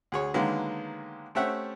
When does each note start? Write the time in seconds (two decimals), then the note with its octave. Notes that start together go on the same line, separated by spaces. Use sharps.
0.12 D2 G#4 C#5
0.34 D3 D#3 F#3 G#3 A#3 B3
1.35 A3 C4 C#4 G4 E5 F#5